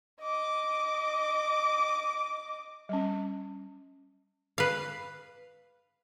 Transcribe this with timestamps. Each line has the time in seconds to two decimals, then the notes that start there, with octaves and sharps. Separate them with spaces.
0.21 D#5 D6
2.89 G3 C#4
4.58 B4 F5